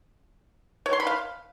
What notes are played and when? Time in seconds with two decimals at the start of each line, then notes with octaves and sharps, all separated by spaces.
0.86 C#5
0.93 C6
1.00 B5
1.07 F5